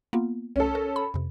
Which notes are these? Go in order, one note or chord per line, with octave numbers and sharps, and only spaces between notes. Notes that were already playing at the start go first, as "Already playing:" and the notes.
A#3 B3 F4
C2 C#4 A4
A#4
B5
F2 C3